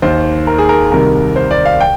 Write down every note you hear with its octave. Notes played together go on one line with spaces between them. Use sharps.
D#2 D#3 C5
A#4
G#4
A#4
C2 C3 D#3 A#4
C5
D5
F5
G5